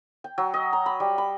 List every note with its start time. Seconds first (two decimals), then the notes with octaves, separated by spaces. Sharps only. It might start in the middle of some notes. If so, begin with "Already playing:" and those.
0.24 G5
0.38 F#3
0.54 D#5
0.73 A#5
0.86 B5
1.00 G3
1.18 B5